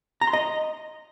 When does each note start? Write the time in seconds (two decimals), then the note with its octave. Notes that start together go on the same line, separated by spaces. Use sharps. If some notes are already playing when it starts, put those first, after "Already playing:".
0.21 A#5
0.27 C6
0.33 D#5